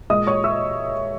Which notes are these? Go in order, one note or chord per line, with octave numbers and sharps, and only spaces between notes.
A#2 G#3 D#5 D#6
C#5 C#6
E5 E6